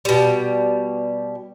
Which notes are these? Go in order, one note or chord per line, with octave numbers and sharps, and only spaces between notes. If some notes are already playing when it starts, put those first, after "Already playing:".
B2 G3